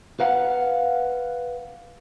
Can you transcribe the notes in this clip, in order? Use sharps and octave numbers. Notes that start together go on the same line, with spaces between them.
B4 F5 F#5